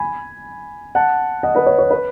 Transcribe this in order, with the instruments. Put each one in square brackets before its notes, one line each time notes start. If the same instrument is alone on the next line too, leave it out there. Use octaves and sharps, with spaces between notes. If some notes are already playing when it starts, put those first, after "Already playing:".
Already playing: [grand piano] G#5 B5
F#5 A5
D#5 F#5
B4 D#5
C#5
C#5
B4